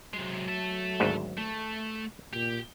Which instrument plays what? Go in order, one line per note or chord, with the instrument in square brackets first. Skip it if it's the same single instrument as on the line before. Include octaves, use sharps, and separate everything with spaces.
[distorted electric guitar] C3 G#3 [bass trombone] F#3
[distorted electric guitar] A4 E5
[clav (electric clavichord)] G#1 D2 G#2
[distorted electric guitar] A3
[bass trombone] A#2 [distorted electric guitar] G4